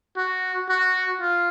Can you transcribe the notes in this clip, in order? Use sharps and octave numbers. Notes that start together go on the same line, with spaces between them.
F#4
F#4
F4